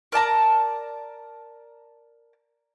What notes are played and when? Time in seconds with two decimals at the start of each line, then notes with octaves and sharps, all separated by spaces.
0.12 A#4 D5 A5 A#5